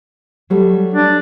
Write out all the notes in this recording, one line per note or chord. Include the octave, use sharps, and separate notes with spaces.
F#3 G3 A3
D4